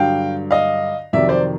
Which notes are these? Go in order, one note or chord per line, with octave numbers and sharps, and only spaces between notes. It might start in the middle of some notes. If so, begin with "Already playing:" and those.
Already playing: G2 D3 F#3 F5 G5
D#5 F5
F2 C3 D#3 F#3 D5 E5
C5 D5